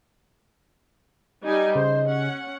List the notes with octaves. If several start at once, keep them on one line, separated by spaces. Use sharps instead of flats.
G3 D#4 D#5 G#5
C#3 C5
C#4 F#5